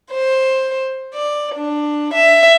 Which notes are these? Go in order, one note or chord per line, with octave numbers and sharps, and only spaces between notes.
C5
D5
D4
E5